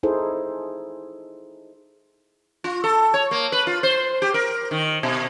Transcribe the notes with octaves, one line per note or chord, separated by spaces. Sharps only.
D#4 E4 G#4 A4 C5
F4
A4
C#5
A#3
B4
F4
C5
G4
A#4
D#3
B2